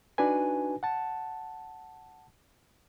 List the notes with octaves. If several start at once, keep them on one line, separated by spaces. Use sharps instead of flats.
D4 D#4 F#4 B4 G#5
F#5 A5